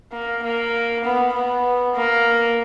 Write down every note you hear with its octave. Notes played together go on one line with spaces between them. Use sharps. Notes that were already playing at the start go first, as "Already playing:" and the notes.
A#3
A#3
B3
B3
A#3